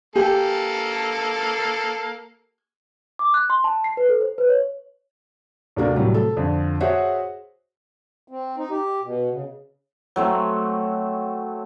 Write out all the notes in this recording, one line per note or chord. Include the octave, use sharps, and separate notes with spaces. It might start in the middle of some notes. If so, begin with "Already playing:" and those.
A#3 G4 A4 G#5
D6
F#6
C6
A5
C7
B4
A4
C5
B4
C#5
D#2 C3 A3 D4 F#4 A#4
A2 C3 F#3 G3
A4
F2 D3
F#4 G#4 C5 C#5 E5 F#5
C4
D#4
G4
B2
C#3
F#3 A3 C4